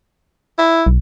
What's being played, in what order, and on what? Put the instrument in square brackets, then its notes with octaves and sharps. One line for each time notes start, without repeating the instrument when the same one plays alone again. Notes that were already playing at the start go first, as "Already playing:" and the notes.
[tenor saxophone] E4
[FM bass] B1